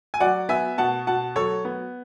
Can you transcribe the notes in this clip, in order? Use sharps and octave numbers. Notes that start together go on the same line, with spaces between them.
G#5
F#3 D5 F#5
B3 E5 G#5
B2 F#5 A5
B2 F#5 A5
F#3 A4 C#5
B3